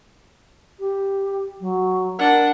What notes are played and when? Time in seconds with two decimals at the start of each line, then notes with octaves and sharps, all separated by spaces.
0.79 G4
1.60 F#3
2.19 D4 A#4 F#5